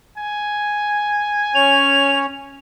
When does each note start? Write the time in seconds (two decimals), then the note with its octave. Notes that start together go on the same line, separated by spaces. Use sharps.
0.18 G#5
1.55 C#4 C#5 F7